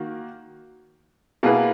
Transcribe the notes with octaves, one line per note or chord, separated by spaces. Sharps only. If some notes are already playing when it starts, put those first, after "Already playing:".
Already playing: D#3 A#3 F#4
B2 A#3 E4 G#4 B4